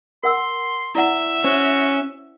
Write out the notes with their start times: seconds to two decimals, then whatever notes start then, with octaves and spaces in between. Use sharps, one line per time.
0.24 A#4 F#5 C6 E6
0.95 E4 D5 E5 F#5
1.44 C#4 F#4 C5